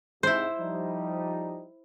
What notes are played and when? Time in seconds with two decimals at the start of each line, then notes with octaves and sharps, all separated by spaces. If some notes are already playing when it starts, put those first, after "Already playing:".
0.23 G#2 C3 E4 C5
0.59 F3 G3 D#4